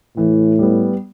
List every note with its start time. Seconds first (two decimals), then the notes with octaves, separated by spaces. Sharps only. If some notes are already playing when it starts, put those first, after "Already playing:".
0.17 A2 E3
0.59 G3 B3